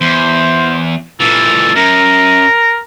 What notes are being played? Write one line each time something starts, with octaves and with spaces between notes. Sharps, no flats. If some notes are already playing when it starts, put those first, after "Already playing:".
E2 C5
A#2 E3 A4
F#2 A#4